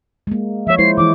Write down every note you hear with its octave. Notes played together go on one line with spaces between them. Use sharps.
G#3 A#3
F3 C#5 E5
G#3 E4 C5 C7
E3 E4 D6